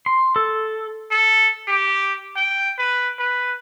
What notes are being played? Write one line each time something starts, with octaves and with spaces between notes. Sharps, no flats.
C6
A4
A4
G4
G5
B4
B4